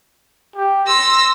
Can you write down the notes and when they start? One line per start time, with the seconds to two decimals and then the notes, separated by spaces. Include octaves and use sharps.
0.55 G4
0.87 C6 E6 A#6